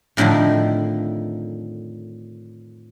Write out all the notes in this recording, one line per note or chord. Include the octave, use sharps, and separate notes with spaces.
F2 A2 D3 D#3 F3